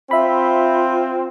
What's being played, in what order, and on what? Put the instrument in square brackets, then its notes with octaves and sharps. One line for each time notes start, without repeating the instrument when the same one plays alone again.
[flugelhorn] C4 [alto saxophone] F4 [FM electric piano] E5 B5